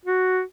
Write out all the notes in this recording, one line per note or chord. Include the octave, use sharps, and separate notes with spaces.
F#4